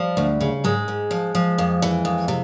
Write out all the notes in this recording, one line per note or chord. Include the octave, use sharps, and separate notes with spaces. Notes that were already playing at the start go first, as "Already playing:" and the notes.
Already playing: F3 G3
D2
C#3
G#2 G#3
G#2
F3
F3
F2
E3
F2
C3